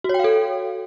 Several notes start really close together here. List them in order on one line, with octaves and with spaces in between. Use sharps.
F#4 C#5 G5 F5 A4